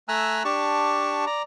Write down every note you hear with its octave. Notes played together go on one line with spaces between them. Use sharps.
A3 E5 G#5 A#5 E6 F#6
D4 G4 A5 C#6
D5 A#5